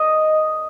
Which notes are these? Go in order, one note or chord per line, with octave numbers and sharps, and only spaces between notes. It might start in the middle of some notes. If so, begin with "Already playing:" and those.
Already playing: D#5